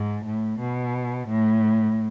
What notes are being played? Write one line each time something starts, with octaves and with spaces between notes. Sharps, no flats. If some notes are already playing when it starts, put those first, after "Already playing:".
Already playing: G#2
A2
B2
A2